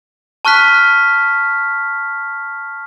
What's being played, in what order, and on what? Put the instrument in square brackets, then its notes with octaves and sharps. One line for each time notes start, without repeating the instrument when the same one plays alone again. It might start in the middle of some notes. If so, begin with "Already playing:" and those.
[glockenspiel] A5 C#6 F6 F#6 B6